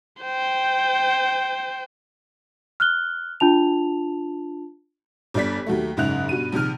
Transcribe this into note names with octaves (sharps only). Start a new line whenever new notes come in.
C5 G5
F6 F#6 G7
D4 F4 A5 F7
G1 G2 D5 B6
D#2 F#3 A3
F#1 G#2 C#3 E5 F#6 F7
G2 B2 D#7
A#1 C3 D#3 F6